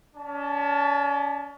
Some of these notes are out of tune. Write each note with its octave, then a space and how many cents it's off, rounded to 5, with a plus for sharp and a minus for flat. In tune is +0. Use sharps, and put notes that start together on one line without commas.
C#4 +35 D5 +15 A5 +0